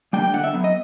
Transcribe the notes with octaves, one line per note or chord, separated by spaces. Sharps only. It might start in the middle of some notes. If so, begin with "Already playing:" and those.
G3 A#3 D4 G5
G5
D3 F#5
E5
F#3 B3
D#5